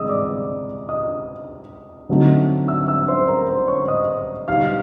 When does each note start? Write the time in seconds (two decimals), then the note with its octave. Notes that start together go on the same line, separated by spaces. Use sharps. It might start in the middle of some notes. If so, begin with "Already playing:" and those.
Already playing: C3 E3 G#3 D#5 D#6 E6
0.09 D5 D6
0.89 D#5 D#6
2.09 D3 F#3 A3 C4 D#4
2.68 E5 E6
2.88 E5 E6
3.08 C5 C6
3.28 A#4 A#5
3.48 C5 C6
3.68 C#5 C#6
3.88 D#5 D#6
4.48 B2 G3 B3 D#4 F5 F6